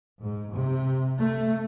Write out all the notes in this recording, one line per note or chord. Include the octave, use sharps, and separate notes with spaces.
G#2
C3
A3